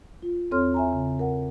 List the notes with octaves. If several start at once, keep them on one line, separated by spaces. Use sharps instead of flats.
F4
E2 C4 A4 C#5 C6 F6
E5 G#5 A#5
C#3
A#4 F#5